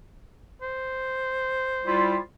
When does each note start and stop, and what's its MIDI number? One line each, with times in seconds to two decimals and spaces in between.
0.62 2.22 72
1.85 2.17 55
1.85 2.17 64
1.85 2.17 65